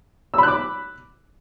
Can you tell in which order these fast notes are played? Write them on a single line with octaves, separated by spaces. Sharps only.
E6 B5 F#6 D6